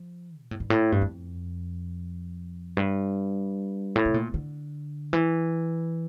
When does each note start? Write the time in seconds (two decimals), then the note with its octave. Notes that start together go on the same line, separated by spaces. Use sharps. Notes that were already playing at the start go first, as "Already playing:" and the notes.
Already playing: F3
0.42 A#2
0.51 A2
0.60 G2
0.70 A2
0.92 G2
1.01 F2
2.77 G2
3.96 A2
4.05 C3
4.14 A#2
4.34 D3
5.13 E3